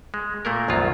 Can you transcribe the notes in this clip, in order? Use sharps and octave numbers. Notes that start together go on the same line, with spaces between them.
G#3
A#2 A3 A#3 A#4
C2 F#2 D#3 F#3 F4